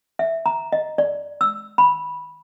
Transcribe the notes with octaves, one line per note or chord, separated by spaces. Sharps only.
E5
A#5
D#5
D5
E6
B5